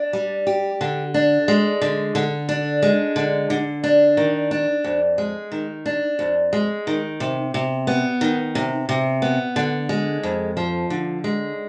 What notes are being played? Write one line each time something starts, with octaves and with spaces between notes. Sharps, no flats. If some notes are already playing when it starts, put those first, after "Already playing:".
Already playing: D4
G3
G4
D3
D4
G#3
D3
D3
D4
G#3
D3
D3
D4
D#3
D4
F2
G#3
D#3
D4
F2
G#3
D#3
C3
C3
B3
D#3
C3
C3
B3
D3
G#3
F2
F3
D3
G#3